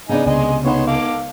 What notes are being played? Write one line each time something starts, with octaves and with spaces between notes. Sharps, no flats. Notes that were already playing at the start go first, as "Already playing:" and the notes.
C#3 B3 D4 D#4 G#5
C#2 C3 D#5 G#5 C6
B3 D#4 B4 C#5 F#5 C6
A4 F5 D6